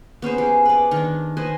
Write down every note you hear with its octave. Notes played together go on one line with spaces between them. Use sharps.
B3 C#4 G#4 C5
G4 G#4
B4 D5
D#3 D4
B4 C5 D#5 G#5